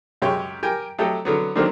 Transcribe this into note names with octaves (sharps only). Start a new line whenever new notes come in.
C#2 F#2 G#3 G4 C#5
G4 A#4 G5 G#5
F#3 A3 G4 A4 D#5
D3 F#3 B3
D3 D#3 F#3 A#3 C4 D4